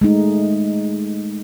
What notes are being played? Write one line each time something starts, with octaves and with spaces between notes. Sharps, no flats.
G#3 A3 D#4